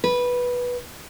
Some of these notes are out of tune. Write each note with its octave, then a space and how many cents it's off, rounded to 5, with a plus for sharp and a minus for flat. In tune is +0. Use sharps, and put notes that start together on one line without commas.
B4 -10